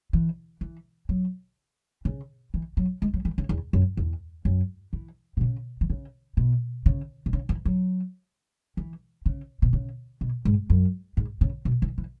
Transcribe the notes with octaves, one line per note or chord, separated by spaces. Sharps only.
E3
E3
F#3
C#3
E3
F#3
G#3
F#3
E3
C#3
E2
F#2
E2
F#2
E3
B2
C#3
E3
C#3
B2
C#3
B2
C#3
E3
F#3
E3
C#3
B2
C#3
B2
G#2
F#2
G#2
C#3
B2
E3
E3